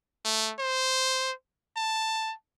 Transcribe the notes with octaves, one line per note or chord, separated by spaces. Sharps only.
A3
C5
A5